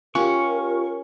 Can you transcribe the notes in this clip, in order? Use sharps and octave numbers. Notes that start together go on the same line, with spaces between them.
C#4 F4 G4 A#4 C#6